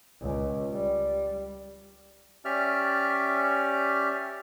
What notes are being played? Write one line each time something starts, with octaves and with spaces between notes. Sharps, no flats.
C#2
G3
C#4 G4 D5 E5 F6